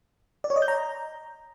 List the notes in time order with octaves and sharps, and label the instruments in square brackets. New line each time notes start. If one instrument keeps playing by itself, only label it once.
[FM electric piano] D5
C#5
D#5
G6
A#5